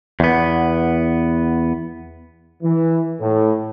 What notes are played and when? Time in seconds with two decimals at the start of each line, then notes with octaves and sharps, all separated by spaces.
0.20 E2 B3
2.63 E3
3.20 A2